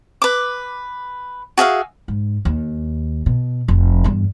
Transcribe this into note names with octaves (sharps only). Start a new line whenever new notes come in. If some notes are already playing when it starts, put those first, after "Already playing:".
B4 D6
F#4 G#4 E5 F5
G#2
D#2
B2
F1
E2 G2